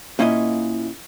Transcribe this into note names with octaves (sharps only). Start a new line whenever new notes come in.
A#2 A#3 C#4 E4 D#5